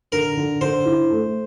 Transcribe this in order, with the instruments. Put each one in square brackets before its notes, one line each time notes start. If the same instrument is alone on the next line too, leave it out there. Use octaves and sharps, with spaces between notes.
[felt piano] D3 [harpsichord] A#4
[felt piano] D3
[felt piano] D3 [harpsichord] C5
[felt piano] E4
A3